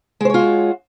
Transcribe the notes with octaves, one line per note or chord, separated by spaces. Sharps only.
G#3 F4 F#4 C5 C#5